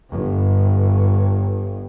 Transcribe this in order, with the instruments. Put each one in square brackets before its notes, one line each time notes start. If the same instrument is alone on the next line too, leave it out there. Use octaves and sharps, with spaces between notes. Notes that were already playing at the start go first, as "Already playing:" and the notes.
[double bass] G1 G2